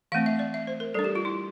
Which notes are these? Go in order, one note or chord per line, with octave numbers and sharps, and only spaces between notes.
E3 A3 C4 F5
E5
D5
E5
C5
A#4
G3 D4 A4
G4
F4
E4